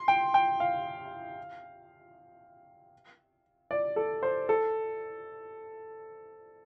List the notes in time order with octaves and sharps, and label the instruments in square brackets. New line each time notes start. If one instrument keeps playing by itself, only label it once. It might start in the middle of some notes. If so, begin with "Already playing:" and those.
Already playing: [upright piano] C6
G5
G5
F5
D5
A4
C5
A4